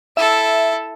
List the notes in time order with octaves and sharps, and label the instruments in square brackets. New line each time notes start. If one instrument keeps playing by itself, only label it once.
[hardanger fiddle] E4 A4 [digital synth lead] E5